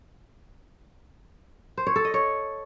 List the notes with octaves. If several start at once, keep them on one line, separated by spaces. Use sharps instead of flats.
C5
C#5
A4
D#5
C#5